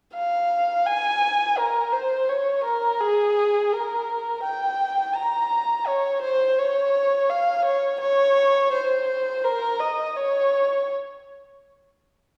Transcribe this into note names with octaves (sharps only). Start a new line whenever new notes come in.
F5
G#5
A#4
C5
C#5
A#4
G#4
A#4
G5
A#5
C#5
C5
C#5
F5
C#5
C#5
C5
A#4
D#5
C#5